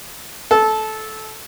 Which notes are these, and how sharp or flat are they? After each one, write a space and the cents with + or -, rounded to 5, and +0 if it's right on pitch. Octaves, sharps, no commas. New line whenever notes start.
A4 -15